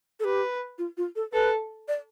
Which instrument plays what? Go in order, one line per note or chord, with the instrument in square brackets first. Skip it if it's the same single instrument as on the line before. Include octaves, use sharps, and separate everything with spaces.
[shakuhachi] A4
[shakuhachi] G4 [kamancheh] B4
[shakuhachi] F4
F4
A4
[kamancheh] A4 [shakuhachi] B4
[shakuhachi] D5